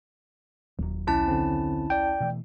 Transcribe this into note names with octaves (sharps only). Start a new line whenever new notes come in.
D#1 D#2 F#3
B1 C#4 E4 A5
D3 C4
D5 G5
B2 E3 A3